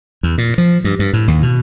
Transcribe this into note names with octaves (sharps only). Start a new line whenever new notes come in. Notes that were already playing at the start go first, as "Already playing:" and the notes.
E2
A#2
F3
G2
G2
A2
D#2
B2